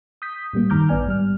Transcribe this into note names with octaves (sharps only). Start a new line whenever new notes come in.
D#6 G6 B6
A2 G3 A#3
G2 D#3 A#5 D6 F6 G6
A1 B3 D5 G#5 F6
G#2 G3 F6